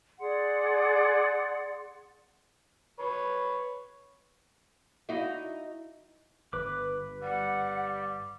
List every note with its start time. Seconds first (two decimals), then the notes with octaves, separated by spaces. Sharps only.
0.19 G#4 D5 F#5 C6
2.99 B4 C#5
5.09 D#4 E4 F#4
6.53 G1 B4 D6
7.22 G3 F#5